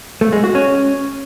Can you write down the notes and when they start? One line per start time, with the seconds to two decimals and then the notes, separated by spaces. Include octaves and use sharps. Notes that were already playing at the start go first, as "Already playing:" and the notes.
0.21 A3
0.32 G#3
0.44 F#4
0.55 C#4